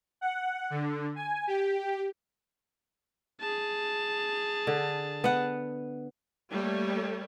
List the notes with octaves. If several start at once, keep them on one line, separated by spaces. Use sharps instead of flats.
F#5
D3
G#5
G4
G4
G#4 A5
D3
B3 F#5
G3 A3 A#3 C#5